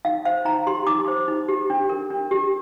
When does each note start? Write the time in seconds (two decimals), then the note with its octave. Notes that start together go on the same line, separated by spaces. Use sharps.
0.05 D#4 F5
0.25 C5 F5
0.45 D#4 A#5
0.67 G4 C6
0.87 D#4 D6
1.08 C5
1.28 D#4
1.48 G4
1.70 D4
1.89 A#4
2.10 D4
2.31 G4